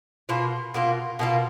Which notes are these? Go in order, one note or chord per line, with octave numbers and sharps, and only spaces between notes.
B2 A#3 F4
B2 A#3 F4
B2 A#3 F4